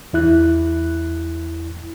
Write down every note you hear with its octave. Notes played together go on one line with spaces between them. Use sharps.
E2 E4 F#6